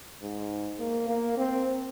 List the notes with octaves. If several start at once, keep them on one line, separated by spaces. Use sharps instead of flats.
G#2
A#3
A#3
C4